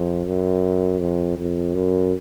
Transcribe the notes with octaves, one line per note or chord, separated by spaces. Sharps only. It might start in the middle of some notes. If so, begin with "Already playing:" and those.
Already playing: F2
F#2
F2
F2
F#2